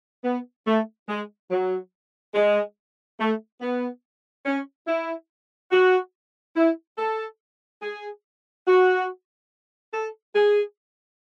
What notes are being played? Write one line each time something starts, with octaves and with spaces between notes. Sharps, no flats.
B3
A3
G#3
F#3
G#3
A3
B3
C#4
E4
F#4
E4
A4
G#4
F#4
A4
G#4